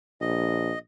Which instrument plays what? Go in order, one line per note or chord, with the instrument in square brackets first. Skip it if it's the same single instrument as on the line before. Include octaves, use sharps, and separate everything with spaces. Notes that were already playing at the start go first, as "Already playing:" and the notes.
[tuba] A#1 [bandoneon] D#5